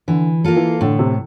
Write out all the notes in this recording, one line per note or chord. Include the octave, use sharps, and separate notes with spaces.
D3 E3
A#3 F4 A4
E3
A2 D3
C3